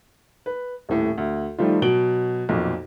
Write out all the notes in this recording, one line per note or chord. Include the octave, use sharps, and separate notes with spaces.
B4
D#1 A2
D2
D#3 F3 G3 A3 F4
B2 F#3 D7 F#7 G7
B1 F2 A#2